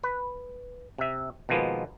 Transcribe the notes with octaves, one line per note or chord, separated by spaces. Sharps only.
B4
C3 E5
B2 D#3 F3 G#3 A#3 B3